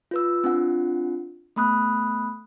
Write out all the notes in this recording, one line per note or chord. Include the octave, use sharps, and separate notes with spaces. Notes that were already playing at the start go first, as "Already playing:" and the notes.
F4 B4 E6
C4 D4 F4 F#5
A3 B3 B5 D#6 F#6